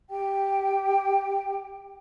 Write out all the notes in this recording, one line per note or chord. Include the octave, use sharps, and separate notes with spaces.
G4 G5